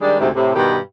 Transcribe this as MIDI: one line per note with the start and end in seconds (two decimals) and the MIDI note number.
0.01 0.19 51
0.01 0.19 55
0.01 0.19 56
0.01 0.19 62
0.20 0.29 38
0.20 0.29 44
0.20 0.29 48
0.35 0.54 45
0.35 0.54 48
0.56 0.78 43
0.56 0.78 47
0.56 0.78 51
0.56 0.78 67